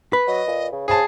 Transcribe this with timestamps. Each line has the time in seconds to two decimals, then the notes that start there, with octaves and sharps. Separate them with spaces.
0.13 B4
0.27 F#3 D#5
0.47 A#2
0.72 C#3
0.88 C#3 G#4 C5 A5